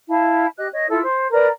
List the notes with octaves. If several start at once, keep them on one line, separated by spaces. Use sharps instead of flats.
E4 F5 A5
G4 D#5 F#6
C#5 D#5
E4 F4 A4 E6
C5
A#4 B4 D5 A#5